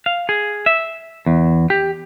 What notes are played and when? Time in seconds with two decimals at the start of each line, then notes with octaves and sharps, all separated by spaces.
0.06 F5
0.29 G#4
0.66 E5
1.26 E2
1.70 G4